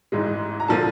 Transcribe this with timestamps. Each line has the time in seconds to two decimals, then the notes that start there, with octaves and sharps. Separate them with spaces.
0.12 A1 G#2 E3 G#3
0.60 A#5
0.68 D3 F3 A#3 A5